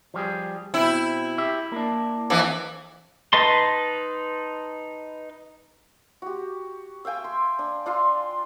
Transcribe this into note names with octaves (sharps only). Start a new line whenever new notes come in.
F3 G3 G#4
B2 C4 E4
G4 E5
A#3 D4
F2 E3
D#4 B4 D#5 A5 C6
F#4 G4
E5 F5 G5 G#5
C6
D4
D4 F4 E5 C6